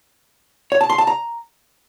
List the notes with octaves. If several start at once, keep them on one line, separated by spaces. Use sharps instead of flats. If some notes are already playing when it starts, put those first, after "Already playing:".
C#5
A5
C6
A5
A#5